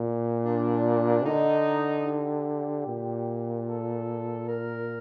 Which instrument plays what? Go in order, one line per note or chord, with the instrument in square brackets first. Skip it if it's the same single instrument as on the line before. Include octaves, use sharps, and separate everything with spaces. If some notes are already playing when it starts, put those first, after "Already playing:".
Already playing: [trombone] A#2
[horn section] D4
[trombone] D3 [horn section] D#4
[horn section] G4
[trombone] A#2
[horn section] A4
A#4